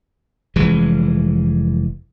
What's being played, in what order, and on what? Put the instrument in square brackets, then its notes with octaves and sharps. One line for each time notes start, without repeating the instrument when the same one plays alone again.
[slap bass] F1 E3 G#3